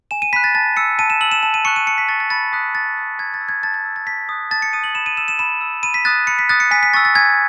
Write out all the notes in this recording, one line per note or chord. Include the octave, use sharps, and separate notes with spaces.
G#5 E7
D#7
B5 F#6 B6
A6
A5 A6
E6 C#7
A5 D#7
E7
E6 F#7
E7
A5 E7
D#7
C#6 F#6 C#7
D#7
A5 C#7
B6
C#6 F#6 A6
A6
B5 A6
D#6 F#6 B6
B5 A6
D#6 F#6
A5 G#6
A6
E6
G#6
A5 A6
G#6
E6
A6
A5 B6
D#6 F#6
A5 A6
C#7
D#6 F#6 D#7
F#7
B5 E7
D#7
E6 E7
E7
B5 E7
E6
B5 D#7
B6
D#6 F#6 A6
B5 C#7
B6
D#6 F#6 A6
C#7
G#5 B6
B6
C#6 E6 A6
A6
G#5 G#6